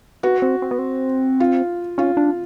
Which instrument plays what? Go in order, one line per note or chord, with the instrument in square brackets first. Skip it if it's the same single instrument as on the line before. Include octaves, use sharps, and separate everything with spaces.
[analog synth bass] B3 [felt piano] F#4
[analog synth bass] C4
C4
B3
C4
[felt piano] F4
[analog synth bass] C#4 [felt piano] F4
[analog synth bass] D4